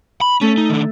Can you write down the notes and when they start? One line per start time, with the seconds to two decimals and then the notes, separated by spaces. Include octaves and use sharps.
0.21 B5
0.41 A3 C#4 A4 E5
0.58 D#4
0.69 D#3 D4